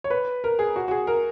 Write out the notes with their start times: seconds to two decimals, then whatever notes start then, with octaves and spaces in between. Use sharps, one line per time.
0.04 C#5
0.10 B4
0.44 A#4
0.59 G#4
0.76 F#4
0.88 F#4
0.91 G#4
1.07 A#4